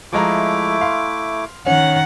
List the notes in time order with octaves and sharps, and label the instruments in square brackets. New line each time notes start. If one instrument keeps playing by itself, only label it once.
[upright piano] F3 G#3 A#5 [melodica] A3 E4 D6
[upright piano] F5 C6
[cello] D#3 F#5 [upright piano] C#4